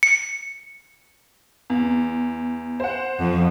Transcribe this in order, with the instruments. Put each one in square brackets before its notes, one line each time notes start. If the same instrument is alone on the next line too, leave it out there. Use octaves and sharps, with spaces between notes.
[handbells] C#7
[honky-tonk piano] E2
C5 F#5
[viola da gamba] F2